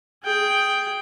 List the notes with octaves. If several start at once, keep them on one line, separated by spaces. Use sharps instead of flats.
G#4 G5